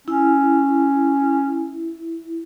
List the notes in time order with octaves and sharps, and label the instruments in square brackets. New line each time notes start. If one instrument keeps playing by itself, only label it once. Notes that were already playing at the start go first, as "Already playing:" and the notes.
[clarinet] C#4 [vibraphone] E4